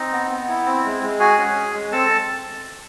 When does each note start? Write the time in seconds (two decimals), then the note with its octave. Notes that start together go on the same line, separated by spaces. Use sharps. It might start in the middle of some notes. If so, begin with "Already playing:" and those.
Already playing: C4 D#4 D#5
0.12 B3
0.29 B3
0.48 E4
0.66 C4
0.84 G#3
1.02 G#3
1.20 F#4 G#4 G#5
1.38 C#4
1.56 G#4
1.74 G#3
1.92 C4 A4 A5